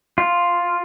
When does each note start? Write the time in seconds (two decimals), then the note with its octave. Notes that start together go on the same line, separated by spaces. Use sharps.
0.18 F4